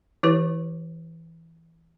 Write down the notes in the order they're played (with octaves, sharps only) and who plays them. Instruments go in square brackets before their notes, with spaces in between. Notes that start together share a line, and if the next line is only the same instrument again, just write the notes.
[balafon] E3 E4 G4 B4 C#5